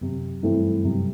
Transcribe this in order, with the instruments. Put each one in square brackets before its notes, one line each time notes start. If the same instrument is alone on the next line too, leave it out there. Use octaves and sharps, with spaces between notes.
[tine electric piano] F#2 F#3 [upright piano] C3
[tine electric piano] G2 G3 [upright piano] E3 A3 C4 E4
[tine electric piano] F#2 F#3 [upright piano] C3